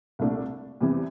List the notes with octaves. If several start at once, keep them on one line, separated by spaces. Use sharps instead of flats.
C2 A#2 A3 D4
E2 C3 E3 G3